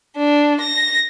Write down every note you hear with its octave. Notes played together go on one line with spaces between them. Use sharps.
D4
A#6